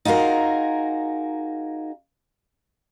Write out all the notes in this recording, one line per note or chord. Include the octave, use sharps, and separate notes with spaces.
D#4 F4 F#4 G#4 A#4